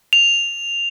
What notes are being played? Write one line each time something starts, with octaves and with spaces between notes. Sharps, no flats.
F7